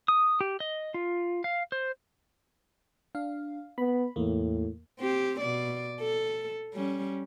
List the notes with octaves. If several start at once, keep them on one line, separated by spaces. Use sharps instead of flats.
D#6
G4
D#5
F4
F5
C5
D4 F5
B3 B5
E2 A2 A#3
C4 G4
B2 D5
A4
G3 C#4